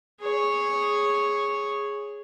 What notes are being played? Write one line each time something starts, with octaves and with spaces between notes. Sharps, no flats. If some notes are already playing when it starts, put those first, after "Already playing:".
G#4 C#5